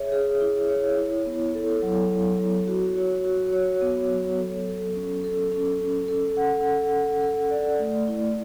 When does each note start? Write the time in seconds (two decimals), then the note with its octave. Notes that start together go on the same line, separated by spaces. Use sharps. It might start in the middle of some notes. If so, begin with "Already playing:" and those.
Already playing: G#4 C#5 E5
0.12 G#4
0.41 E4
0.69 C#5
0.98 E4
1.26 B3
1.54 A4
1.83 F#3
2.11 B3
2.39 F#3
2.67 F#4
2.97 C#5
3.25 F#4
3.53 C#5
3.81 B3
4.10 F#3
4.38 A4
4.67 A4
4.96 C#4
5.24 A4
5.52 C#4
5.81 C#4
6.08 A4
6.37 F#5
6.66 A4
6.94 F#5
7.22 A4
7.50 D5
7.79 A3
8.08 E4